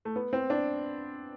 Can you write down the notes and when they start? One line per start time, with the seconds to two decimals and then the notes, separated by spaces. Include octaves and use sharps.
0.05 A3
0.16 B3
0.33 C4
0.50 D4